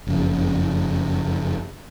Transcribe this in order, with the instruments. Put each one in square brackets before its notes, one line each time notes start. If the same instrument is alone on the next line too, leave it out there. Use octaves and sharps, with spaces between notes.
[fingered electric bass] F#1 F2 C#3